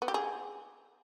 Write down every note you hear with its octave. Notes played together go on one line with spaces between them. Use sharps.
B3
G4
G#4